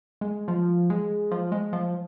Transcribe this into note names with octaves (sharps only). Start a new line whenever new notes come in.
G#3
F3
G#3
F3
G#3
F3